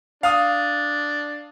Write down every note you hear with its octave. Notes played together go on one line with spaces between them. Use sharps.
D4 F5 D#6